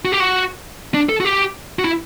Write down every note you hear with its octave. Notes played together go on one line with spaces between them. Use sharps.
F#4
G4
F#4
D4
A4
F#4
G4
F#4
E4